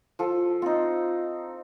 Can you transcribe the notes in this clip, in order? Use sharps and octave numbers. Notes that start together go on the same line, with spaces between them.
F3 A4
C4 D#4 F4